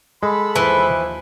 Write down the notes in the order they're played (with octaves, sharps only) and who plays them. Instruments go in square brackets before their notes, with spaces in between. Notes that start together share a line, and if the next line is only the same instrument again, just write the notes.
[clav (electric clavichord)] G#3 [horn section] A4 B5
[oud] D#2 F3 [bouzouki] E3